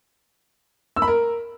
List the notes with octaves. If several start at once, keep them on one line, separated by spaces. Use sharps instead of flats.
E6
B5
A#4